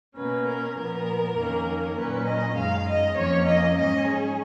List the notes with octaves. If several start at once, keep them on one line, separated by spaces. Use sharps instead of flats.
B2 A#3 C#4 B4
A#4
A#2 F3 B3 A#4
F2 D#3 A#3 C#4
A#2 F#3 C#4 B4
D#5
F#2 D#3 G#3 F5
D#5
F2 F3 A#3 C#4 C#5
D#5
G#2 F#3 C#4 D#5
G#4